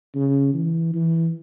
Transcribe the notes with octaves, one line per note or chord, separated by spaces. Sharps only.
C#3
E3
E3